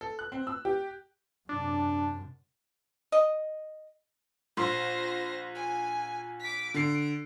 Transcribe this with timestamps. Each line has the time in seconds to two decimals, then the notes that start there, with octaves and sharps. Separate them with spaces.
0.01 A4
0.19 F#6
0.32 C4
0.47 E6
0.65 G4
1.49 F#2 C3 D4
3.12 D#5
4.57 A#1 C5 C6 A#6
5.55 G#5
6.40 D6 B6
6.74 D3 C7 D7